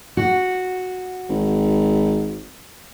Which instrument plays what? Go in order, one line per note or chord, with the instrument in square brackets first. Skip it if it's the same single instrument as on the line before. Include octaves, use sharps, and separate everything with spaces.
[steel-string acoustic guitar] F#4
[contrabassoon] G#1